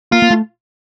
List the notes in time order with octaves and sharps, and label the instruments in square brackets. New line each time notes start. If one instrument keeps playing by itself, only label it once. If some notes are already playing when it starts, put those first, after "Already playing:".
[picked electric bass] A#3 [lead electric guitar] F4
[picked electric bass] A#3
A3